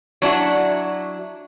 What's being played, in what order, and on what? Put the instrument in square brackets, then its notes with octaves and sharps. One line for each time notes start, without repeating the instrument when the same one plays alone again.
[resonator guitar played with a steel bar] F#3 D4 E4 F#4